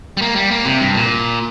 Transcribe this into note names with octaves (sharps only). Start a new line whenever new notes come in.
G3
A#3
G3
A#3
C3
G2
A#2